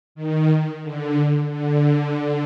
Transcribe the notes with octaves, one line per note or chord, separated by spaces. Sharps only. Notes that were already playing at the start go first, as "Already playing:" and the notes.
D#3
D3
D3